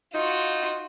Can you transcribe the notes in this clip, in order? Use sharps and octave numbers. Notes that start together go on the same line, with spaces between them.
D#4 F4 F#4